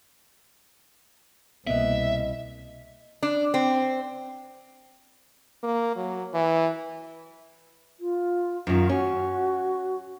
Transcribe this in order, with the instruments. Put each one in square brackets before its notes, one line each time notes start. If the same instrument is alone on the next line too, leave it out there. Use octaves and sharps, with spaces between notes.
[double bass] C2 [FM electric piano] B2 A#3 B3 [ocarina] D#5 [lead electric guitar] E5
[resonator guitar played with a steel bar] D4
C4
[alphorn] A#3
F#3
E3
[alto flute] F4
[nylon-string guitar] F#2 D#3 [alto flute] F4
[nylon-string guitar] C#4 [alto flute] F#4